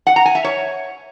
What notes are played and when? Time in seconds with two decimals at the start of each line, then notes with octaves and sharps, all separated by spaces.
0.07 F#5
0.16 A#5
0.26 G#5
0.35 E5
0.44 C#5